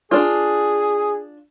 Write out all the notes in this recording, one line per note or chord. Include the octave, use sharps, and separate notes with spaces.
D4 F4 G#4